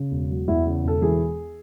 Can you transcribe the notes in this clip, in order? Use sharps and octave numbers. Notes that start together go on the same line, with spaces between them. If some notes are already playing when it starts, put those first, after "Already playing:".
Already playing: C#3
E1
F#3
E2 E4
C#3
E1 A4
E3 G#4